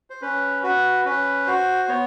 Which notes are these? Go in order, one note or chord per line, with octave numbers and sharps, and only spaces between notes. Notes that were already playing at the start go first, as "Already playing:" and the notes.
C5
C#4 B4
F#4 B4
C#4 B4
F#4 C5
B3 C#5